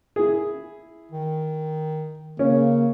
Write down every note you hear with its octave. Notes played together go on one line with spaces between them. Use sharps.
E4 G#4
D#3
C#3 A#3 C#4